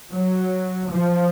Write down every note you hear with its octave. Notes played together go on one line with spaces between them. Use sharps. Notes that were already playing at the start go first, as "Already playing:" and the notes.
F#3
F3